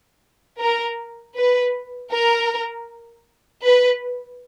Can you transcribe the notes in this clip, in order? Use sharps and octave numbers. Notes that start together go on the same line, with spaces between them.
A#4
B4
A#4
B4